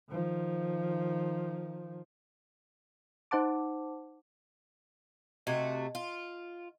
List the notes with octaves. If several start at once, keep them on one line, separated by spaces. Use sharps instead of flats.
D#3 F3
D#4 C5 F#5 A5 D6
C3 A3 F#4 D#5 G#6
F4